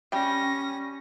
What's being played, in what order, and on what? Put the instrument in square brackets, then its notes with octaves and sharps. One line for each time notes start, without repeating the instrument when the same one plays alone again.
[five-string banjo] G3 G5 [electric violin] C#4 A#6